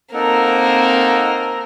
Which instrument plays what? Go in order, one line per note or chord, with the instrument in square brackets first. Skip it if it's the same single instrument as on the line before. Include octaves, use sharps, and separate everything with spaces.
[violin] A#3 C4 [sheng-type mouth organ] D#4 A4 F#5 [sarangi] A#4